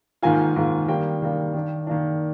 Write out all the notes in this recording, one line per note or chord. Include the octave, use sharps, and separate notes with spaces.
G#2 D#3 A#3 F4 G#5
G#2 D#3 A#3 F4
D#3 G3 A#3 D4 G5
D#3 G3 A#3 D4
D#3 A#3 D4
D#3 A#3 D4